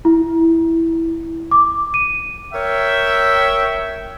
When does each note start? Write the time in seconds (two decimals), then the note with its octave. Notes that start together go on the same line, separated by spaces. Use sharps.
0.05 E4
1.51 D6
1.94 D#7
2.53 A#4 C#5 E5 G5